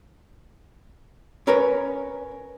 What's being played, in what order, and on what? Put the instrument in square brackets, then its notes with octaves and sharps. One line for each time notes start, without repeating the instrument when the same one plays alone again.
[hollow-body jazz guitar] C#4 A#4 B4 C#5